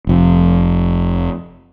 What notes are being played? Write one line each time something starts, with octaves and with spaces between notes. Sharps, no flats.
F1 F2